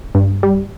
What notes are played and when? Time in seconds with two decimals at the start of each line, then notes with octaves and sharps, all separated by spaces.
0.15 G2
0.43 G3